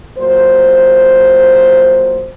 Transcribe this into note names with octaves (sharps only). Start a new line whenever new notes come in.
A#2 F#3 C5